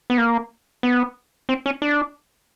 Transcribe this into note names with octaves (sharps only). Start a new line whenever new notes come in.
B3
A#3
B3
C4
C#4
D4